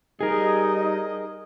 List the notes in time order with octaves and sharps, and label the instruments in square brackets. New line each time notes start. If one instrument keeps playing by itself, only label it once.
[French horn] G3 [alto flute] D#4 [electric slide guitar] G#4 A#4 [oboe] D#5